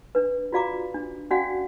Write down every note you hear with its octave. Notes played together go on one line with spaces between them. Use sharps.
D4 B4
F4 F#4 D5 F5 A#5 D6
D4
C#4 F#4 D5 F5 F#5 G#5